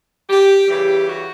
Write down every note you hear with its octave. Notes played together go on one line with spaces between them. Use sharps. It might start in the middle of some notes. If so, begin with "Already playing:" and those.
G4
C#3 E3 G3 G4
F#4